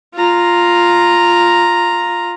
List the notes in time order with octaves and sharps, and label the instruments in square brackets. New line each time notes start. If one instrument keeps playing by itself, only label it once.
[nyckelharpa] F4 A#5